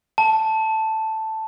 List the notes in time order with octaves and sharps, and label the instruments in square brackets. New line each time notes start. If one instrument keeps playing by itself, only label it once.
[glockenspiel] A5